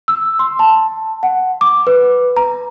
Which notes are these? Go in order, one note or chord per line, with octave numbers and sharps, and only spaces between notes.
E6
C6
A5
F#5
D6
B4
A#5